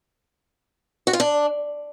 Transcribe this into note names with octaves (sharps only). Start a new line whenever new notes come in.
F#4
F4
D4